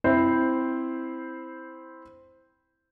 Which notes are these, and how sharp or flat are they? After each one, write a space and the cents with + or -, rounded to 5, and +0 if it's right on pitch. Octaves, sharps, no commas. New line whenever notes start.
C4 +0 E4 +0 C5 +0